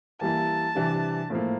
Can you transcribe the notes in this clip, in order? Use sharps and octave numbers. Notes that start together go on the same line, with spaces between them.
E3 G3 A#3 E4 A5
C3 E3 G3 D4
A2 F3 A#3